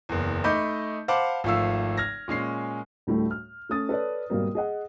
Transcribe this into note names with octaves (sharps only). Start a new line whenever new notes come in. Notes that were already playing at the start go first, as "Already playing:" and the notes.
F#1 E2
A3 D#4 D#5 B5 D6 G6
C5 F5 F#5 A5 B5 D6
G#1 F3 A3 F5 E6
F6 G#6 A#6
A#2 G#3 C#4 C7
D2 A2 G3 A3
F6
A3 C#4 D#6 A6
A4 B4 C#5 D5
G#1 B2 G3 A#3
G#4 D#5 F#5